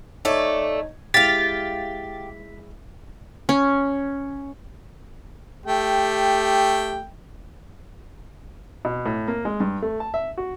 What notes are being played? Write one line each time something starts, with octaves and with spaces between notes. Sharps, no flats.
A3 D#4 C#5 D5
G#3 E4 G4 F5 A6 B6
C#4
A3 G4 G5
B2
A2
A#3
G#3
G2
A3
A5
E5
F#4